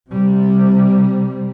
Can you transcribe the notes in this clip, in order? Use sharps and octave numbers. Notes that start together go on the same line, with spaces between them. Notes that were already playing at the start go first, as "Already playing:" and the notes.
C3 G3